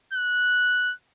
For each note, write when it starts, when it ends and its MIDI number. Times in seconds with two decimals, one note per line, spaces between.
0.13 0.93 90